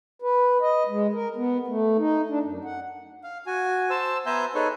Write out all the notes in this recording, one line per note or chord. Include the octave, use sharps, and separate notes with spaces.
B4
D#5
G#3
A#4
B3
A3
D#4
D4
F#2
F#5
F5
F#4 G#5
C5 A5 E6
B3 C5 E5 G#5 A#5 G6
D#4 G#4 A4 B4 C#5 G#5